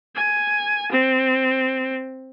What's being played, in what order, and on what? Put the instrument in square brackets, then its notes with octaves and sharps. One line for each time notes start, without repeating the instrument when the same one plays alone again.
[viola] G#5
C4